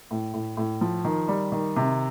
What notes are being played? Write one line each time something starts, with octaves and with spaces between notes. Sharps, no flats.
A2
A2
A2
F3
D#3
G3
D#3
C3